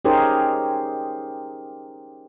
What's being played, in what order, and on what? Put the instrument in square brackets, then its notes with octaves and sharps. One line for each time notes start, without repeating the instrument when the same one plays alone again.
[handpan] C#4 D#4 G4 G#4 A#4 C5